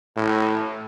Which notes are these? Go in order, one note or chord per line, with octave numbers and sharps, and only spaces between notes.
A2